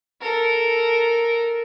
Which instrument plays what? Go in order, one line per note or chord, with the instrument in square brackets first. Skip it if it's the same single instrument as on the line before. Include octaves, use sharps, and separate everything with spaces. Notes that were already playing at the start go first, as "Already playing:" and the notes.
[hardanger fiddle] A4 A#4